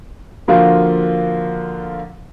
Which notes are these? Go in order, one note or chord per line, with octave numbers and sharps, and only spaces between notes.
D3 F3 A#3 F4 F#4